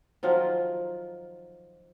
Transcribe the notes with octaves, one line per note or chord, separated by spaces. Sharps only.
D#3 F3 F#3 F4